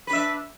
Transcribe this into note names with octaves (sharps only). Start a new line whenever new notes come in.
D4 B4 E5